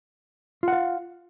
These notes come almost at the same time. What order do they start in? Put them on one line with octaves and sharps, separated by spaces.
F4 F#5 F5